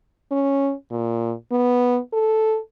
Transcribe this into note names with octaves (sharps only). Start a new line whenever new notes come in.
C#4
A#2
B3
A4